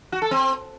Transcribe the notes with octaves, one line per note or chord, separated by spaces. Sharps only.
F#4
A4
C4